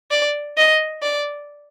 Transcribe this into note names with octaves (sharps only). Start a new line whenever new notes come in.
D5
D#5
D5